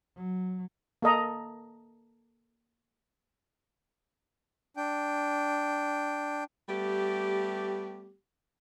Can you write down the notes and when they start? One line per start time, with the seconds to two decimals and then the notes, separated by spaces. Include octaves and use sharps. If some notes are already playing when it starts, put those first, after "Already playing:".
0.16 F#3
1.02 A#3 A4 D#5 A#5
4.77 D4 G5
6.69 G3 A3 B3 G4